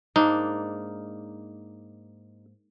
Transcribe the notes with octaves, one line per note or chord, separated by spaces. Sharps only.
G#2 A#3 D4 D#4